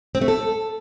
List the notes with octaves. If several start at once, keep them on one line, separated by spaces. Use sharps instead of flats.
C4
A3
A4